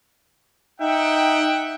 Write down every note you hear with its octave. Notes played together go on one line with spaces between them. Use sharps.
D#4 E5 F#5 G5